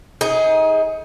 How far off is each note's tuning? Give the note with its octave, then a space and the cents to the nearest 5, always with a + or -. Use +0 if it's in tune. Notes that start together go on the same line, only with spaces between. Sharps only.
D#4 +30 G#4 +0